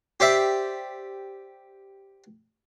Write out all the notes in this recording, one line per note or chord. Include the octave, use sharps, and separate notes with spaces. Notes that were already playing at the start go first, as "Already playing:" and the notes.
G4 C5 D5 E5